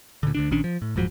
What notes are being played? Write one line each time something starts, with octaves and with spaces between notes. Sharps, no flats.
D2 A#2 D3
D2 D3 D4
A#1 D#3 C#4 D4
F3
A2
D#1 G#2 F3 F#3